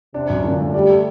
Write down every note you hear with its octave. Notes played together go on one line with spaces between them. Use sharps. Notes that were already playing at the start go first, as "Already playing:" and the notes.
C3 D4
F#2
A#2 D3
A3
G3 D5
A3